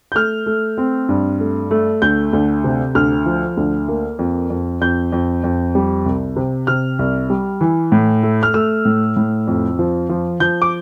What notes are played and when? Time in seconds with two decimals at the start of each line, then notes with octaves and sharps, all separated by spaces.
0.12 G6
0.15 A3 F6
0.46 A3
0.78 C4
1.09 G2
1.40 A3
1.71 A3
2.02 D2 G6
2.33 D2
2.64 C3
2.95 D2 F6
3.26 F3
3.57 D2
3.88 A#3
4.19 F2
4.50 F2
4.81 F2 G6
5.12 F2
5.44 F2
5.75 G3
6.06 C2
6.36 C3
6.67 C3 F6
6.99 C2
7.30 G3
7.61 E3
7.92 A2
8.23 A3
8.43 F6
8.54 A3 E6
8.85 A2
9.17 A2
9.47 F2
9.79 F3
10.09 F3
10.40 F3 G6
10.62 D6